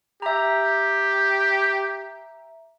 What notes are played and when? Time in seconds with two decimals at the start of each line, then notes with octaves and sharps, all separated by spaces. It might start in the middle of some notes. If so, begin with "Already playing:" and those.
0.22 G4 E5 A#5